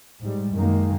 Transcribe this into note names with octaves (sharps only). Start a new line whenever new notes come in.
G#2 G3
F#2 D#3 G#3 A#3